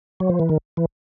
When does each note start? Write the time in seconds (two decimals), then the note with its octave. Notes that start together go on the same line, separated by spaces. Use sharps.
0.20 F#3
0.29 F3
0.40 E3
0.49 D#3
0.77 E3